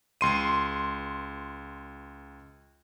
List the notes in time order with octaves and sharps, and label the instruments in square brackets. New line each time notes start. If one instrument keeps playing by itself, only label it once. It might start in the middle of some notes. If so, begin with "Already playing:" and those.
[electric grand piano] C#2 C6 D#7